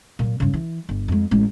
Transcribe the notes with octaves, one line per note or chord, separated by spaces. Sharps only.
A#2 F#3
G2 C#3
E3
G1
F2 G#3
A1 G#3